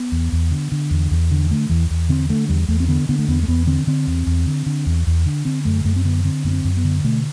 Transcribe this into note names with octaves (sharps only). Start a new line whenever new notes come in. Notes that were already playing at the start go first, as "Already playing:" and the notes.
Already playing: B3
E2
E2
D3
D3
E2
E2
D3
D3 A3
E2 E3
E2
D3 C4
D3 A3
E2 G3
E2 A3
C4
D3 B3
D3 B3
A3
E2 B3
A3
E2 B3
D3 C4
D3 C4
E2
E2
D3
D3
E2
E2
D3
D3 C4
F#2 A3
F#2 A3
C4
D3 B3
D3 C4
F#2 B3
C4
F#2
B3
D3
B2 A3